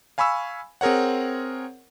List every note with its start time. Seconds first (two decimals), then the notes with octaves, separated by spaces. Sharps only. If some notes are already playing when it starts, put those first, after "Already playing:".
0.18 F5 G#5 B5 C#6 E6
0.81 C4 G#4 A#4 C#5 F#5